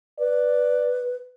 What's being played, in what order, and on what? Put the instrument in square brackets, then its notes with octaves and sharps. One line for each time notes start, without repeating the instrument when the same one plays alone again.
[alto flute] B4 [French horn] D5